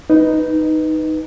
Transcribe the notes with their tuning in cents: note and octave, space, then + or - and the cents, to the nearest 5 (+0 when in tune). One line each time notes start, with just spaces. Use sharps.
D#4 +0 B4 +0